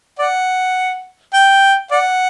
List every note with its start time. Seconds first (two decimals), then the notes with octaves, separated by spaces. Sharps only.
0.19 D5 F#5
1.34 G5
1.91 D5 F#5